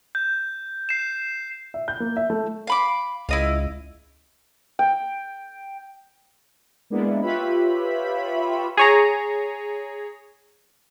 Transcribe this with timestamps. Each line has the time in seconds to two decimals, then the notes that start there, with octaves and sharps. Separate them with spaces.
0.15 G6
0.89 C7 E7
1.74 E5
1.88 G6
2.00 A#3
2.17 E5
2.30 A3
2.67 F5 B5 D6
3.29 C#2 E4 D#5 F5
4.79 G5
6.90 G#3 A#3 B3 D4 E4
7.21 F4 G4 B4 C#5 E5 B5
8.77 G#4 C#5 A#5